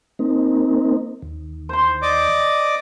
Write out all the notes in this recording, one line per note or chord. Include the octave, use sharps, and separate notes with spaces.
A#3 C4 D#4
D#2
C5 C6
D5 D#5 D6